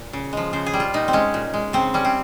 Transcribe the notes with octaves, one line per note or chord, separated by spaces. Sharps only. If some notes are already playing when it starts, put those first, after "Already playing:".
Already playing: A#2
C#3
F3 G#3
C#3 C5
G#4
G3
F4
A#2 D#4
C4
G#3 C#4
A#2
G#3
C#3 C4
G3 C#4
C4